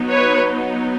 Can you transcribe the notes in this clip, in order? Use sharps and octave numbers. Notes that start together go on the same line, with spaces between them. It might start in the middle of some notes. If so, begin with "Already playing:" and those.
Already playing: F#3 B3 D#4
B4 C#5